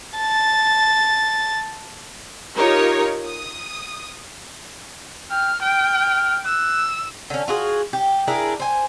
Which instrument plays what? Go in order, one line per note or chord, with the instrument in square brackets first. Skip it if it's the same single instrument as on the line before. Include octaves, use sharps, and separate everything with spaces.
[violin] A5 A6
[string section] D#4 F4 G4 A#4 C#5
D#6
[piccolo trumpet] G5 [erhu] F6
[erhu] G5 [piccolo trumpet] F6
[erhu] E6 [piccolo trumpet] F#6
[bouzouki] D3 C#4
F4 F#4 G#4
G4
D4 E4 G#4 A#4
C5 G#5